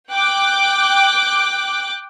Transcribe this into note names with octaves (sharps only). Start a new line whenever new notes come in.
G5 D6 F#6